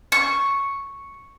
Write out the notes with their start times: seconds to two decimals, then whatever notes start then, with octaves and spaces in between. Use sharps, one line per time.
0.12 C#6